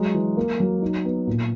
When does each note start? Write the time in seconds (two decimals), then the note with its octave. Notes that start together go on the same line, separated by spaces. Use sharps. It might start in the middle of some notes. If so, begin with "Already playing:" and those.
Already playing: F#3 G#3
0.14 E3
0.37 A#3
0.60 F#3
0.82 D#4
1.05 B3
1.27 A#2